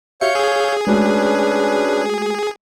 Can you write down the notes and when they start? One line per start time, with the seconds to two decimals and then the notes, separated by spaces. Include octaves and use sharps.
0.21 F#4 G4 C#5 E5 F5 G6 C#7
0.35 G#4 E6
0.87 G#3 A3 C#4 D4 F#4 B4